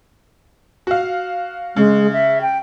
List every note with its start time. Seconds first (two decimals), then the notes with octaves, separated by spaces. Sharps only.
0.87 F#4 F5
1.76 C#3 G#3
2.12 E5
2.41 G5